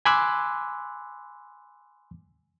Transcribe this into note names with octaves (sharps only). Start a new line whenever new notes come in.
G#5 B5 C6 D6 E6 F#6